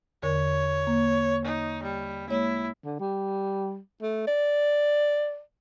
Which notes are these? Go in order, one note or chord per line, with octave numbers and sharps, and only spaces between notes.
E2 D3 A#4 C#5
A#3
D#4
G3
G#3 A#3 E4 C#5
D3
G3
A3
D5